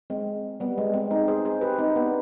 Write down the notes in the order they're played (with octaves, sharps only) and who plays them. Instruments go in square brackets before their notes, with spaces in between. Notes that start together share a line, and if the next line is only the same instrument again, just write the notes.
[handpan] G#3 C4
G3 B3
G#3
G#3 C4
C4 D#4
G#4 C5
G#4 C5
G4 B4
C4 D#4
B3 D4